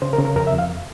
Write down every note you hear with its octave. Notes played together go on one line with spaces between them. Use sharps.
C#3 C5
A#4
C#3
A#4
F2 A#4
E5
F2
F5